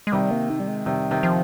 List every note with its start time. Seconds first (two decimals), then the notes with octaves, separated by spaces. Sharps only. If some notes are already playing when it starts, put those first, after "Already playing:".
0.07 G#3
0.12 C3 D#3 G3
0.31 A#3
0.50 D#4
0.60 G3
0.68 G#3
0.86 C3 D#3 G3
1.11 C3 D#3
1.23 F3